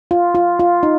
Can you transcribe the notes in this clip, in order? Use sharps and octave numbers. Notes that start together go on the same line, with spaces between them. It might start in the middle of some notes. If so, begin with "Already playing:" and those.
F4
F4
F4
D#4